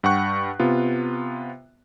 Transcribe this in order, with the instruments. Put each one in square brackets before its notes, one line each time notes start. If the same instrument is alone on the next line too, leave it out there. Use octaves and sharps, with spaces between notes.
[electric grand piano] G2 F#5 G5 C#6 F#6
C3 B3 F4